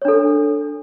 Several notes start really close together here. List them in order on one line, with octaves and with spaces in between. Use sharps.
C#5 D4 A4